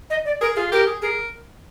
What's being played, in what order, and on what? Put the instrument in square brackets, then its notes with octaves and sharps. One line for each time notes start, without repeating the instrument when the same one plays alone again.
[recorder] D#5
D5
[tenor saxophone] G#4 [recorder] A#4
[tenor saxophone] F4 [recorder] G#4
[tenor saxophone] G4 [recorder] A#4
[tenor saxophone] G#4
[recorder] G#4 [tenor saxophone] A#4